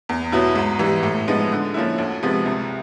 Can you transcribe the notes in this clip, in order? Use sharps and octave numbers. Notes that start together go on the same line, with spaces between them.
E2
B2 F#3 B3 E4
G#2
E3 G3
A2
F3 G#3 B3 D#4
D3
F3 A#3 C#4 E4
D2
C3 F3 G#3 B3
C2